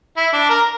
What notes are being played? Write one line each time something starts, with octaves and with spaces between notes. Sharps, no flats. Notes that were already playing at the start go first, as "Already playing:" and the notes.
E4
D4
A#4